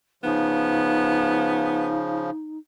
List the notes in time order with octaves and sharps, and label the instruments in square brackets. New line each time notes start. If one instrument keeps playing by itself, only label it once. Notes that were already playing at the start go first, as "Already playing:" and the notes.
[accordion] C#3 F3 [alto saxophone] B3 [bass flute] D#4